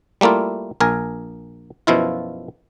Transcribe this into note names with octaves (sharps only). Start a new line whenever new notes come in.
G3 A3 A#3 E4 F4
A#1 A#4 G#5
F#2 B2 F3 E4 F4